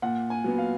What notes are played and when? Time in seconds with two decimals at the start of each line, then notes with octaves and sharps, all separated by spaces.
0.02 A#2 F#5
0.30 G#5
0.44 F#3 B3
0.58 F5